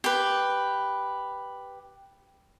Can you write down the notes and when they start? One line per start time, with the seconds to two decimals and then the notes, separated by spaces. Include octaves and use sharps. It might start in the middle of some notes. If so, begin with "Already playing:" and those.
0.04 G4 B4